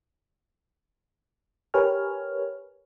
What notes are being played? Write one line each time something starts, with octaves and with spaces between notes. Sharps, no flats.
G4 A#4 B4 C#5 G#5 F6